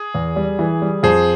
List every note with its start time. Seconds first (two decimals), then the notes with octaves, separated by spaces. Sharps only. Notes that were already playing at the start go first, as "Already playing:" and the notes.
Already playing: G#4
0.15 E2
0.36 G3
0.59 E3
0.82 G3
1.03 F2 G#4 C5